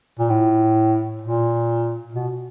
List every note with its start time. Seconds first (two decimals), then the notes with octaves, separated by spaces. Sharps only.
0.19 A#2
0.30 A2
1.21 A#2
2.14 B2